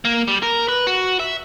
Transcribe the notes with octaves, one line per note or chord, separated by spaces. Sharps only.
A#3
G3
A#4
B4
F#4
E5